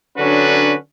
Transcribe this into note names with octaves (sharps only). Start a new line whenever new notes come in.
D3 F#3 C#4 D4 F#4 B4